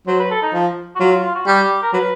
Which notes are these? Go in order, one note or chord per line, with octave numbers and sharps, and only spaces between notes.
F#3 C5
B4
A4
D#4
F3
F#4
F#3 F4
F4
F4
F#4
G3 G4
A#4
F#3 B4